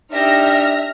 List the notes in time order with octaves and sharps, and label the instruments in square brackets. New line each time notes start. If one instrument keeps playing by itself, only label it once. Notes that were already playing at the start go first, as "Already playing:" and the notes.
[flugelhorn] D4 [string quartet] D#4 G4 [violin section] E5 F6 A#6